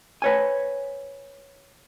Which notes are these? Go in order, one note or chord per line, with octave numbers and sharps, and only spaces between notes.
B4 C#5 G#5